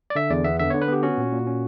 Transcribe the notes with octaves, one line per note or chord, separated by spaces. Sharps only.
D5
D3 E5
E2 D5
B3 E5
D3 E5
D3 C#5
B4
B3 G4
C#4 F#4
A#2
A#2
C#4